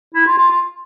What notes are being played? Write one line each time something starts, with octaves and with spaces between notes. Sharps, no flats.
E4
F4
F4
F4